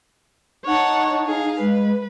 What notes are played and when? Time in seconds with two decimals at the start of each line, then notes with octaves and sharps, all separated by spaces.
0.66 D#4 C#5 F#5 A5
1.27 G#4 F5
1.60 G#3 B4